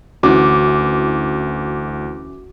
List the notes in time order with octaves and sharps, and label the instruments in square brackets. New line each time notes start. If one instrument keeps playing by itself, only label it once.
[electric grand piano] D2 [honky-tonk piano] E3 C#4 [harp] F#4 [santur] D6